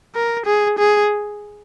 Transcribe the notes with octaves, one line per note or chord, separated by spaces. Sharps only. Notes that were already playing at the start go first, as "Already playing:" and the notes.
A#4
G#4
G#4